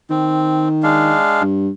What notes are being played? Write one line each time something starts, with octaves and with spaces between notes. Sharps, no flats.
D#3 C4
G#3 D4 F5
G2